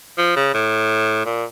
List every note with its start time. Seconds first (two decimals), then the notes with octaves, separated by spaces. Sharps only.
0.18 F3
0.36 C#3
0.54 A2
1.25 A#2